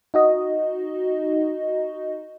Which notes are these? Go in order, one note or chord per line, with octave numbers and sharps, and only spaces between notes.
D#4 F#4 D#5